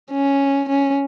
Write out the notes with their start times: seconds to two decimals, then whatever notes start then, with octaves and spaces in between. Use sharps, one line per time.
0.12 C#4
0.69 C#4